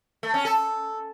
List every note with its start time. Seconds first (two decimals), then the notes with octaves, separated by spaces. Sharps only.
0.23 A3
0.34 C#4
0.45 A4